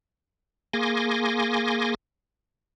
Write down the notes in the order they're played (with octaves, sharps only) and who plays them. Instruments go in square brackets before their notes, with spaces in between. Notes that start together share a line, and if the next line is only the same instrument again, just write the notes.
[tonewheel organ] A#3 G#4 G#5 C6 D6 A#6